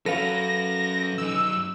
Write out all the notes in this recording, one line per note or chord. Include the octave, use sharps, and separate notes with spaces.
F#3 C#4 A4 B4 F5 A#6
F#2 D#4 E6